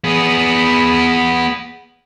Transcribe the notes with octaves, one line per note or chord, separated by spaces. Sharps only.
B3 G#4